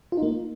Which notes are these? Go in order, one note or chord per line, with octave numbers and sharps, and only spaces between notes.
F4
D#4
A#3